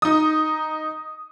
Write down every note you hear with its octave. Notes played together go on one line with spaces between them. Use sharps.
D#4 D#6